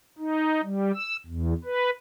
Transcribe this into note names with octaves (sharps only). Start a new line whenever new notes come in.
D#4
G3
E6
E2
B4